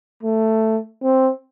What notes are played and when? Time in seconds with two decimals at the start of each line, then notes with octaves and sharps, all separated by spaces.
0.23 A3
1.03 C4